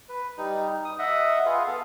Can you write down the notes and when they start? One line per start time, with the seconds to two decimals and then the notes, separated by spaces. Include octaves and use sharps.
0.09 B4
0.38 G3 D#4
0.84 D#6
0.99 D#5 E5 F#5
1.45 F4 G#4 B4 F5
1.66 B3 A4 F5